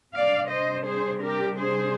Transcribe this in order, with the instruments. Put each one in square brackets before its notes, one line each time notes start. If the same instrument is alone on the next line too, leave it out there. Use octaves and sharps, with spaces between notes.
[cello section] C3 G3 D4 D5 F5
C5 D#5
G#4 C5
G4 A#4
G#4 C5